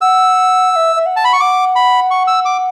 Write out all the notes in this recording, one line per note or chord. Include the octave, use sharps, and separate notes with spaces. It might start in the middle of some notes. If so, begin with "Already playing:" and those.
F#5 E6
F#5
E5
E5
F#5
A5
B5
C#6
F#5 D6
B5
C#6
E6
D6